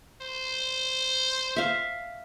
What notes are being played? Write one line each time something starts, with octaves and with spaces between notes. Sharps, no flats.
C5
E5 F5